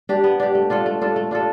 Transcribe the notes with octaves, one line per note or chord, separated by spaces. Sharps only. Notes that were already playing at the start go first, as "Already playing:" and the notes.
D4 G4
B3
D4 G4
A3
D4 F4 A4
A3
D4 F4 A4
A3
D4 F4 A4